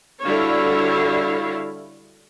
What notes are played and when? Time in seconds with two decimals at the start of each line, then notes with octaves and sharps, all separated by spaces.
0.23 D3 G3 E4 F#4 C#5 F5